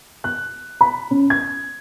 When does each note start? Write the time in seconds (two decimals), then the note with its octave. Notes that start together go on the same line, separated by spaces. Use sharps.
0.24 F#6
0.81 B5
1.11 C#4
1.30 G#6